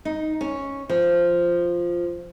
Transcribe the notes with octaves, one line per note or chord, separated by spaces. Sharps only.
D#4
C#4
F3